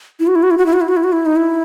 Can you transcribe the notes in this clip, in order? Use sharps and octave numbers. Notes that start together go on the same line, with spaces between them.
E4
F#4
E4
F#4
E4
F#4
E4
F#4
E4
F#4
E4
F#4
E4
D#4
E4